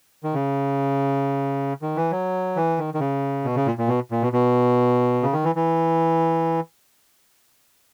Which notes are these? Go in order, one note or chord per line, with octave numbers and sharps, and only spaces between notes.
D#3
C#3
D#3
E3
F#3
E3
D#3
D#3
C#3
B2
C#3
A#2
A#2
B2
A#2
B2
B2
C#3
D#3
E3
E3